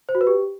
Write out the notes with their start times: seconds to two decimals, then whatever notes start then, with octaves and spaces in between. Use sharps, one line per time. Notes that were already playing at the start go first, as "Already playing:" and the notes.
0.09 C5
0.15 F#4
0.21 B4
0.27 G4